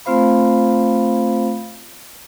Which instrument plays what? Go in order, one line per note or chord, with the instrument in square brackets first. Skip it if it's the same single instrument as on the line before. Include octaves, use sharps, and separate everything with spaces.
[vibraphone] A3 C4 F4 C5 F5 B5